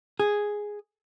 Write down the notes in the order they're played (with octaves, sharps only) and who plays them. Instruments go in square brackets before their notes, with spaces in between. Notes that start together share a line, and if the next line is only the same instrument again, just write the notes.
[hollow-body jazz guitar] G#4